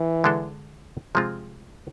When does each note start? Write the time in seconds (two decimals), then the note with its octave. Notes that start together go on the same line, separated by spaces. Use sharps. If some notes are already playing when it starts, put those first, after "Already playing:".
Already playing: E3
0.24 D3 G#3 D4 A4
1.15 C3 F3 G#3 C4 F4